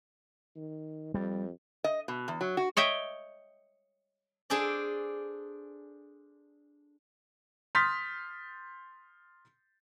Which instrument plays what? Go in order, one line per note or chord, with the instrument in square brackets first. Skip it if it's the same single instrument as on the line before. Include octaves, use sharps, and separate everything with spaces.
[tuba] D#3
[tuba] F2 [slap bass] G3
[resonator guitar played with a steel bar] D#5
B2
E2
F#3
F#4
[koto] C#5 D#5 E5 G5
[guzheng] D4 G#4 A4 C5 D5
[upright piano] C6 D#6 F6 G6 A6 B6